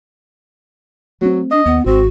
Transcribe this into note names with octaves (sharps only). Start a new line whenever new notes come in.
F#3 A3 C4
D4 D#5
D#2 B3
G#1 C4 F#4